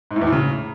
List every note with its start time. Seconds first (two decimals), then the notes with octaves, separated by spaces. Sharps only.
0.11 G#2
0.16 A2
0.21 E2
0.27 A2
0.32 C#3